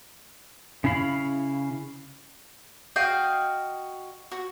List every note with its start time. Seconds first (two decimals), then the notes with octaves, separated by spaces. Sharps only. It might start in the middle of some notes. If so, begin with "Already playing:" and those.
0.84 C#3 C#4 E4 F5 B5
2.96 F#4 D#5 F5 G5
4.32 F#4